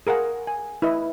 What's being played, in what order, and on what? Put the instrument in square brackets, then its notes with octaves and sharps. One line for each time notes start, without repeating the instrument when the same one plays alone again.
[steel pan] G#4 A#4 F5 F#5 A#5
G#5
E4 B4 D#5